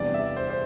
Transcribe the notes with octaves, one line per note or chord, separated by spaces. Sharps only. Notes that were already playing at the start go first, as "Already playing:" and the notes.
Already playing: E2 C3 G3 D4 D5
E5
C5
C5